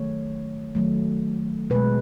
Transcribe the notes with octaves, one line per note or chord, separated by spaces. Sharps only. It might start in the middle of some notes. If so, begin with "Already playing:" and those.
Already playing: D#3 F#3 A3 C#5
D#3 F#3 A3
B2 G#3 B4